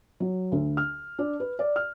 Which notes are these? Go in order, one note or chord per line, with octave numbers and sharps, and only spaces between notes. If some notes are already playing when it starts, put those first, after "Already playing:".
F#3
D2
F6
D4
B4
D5
F6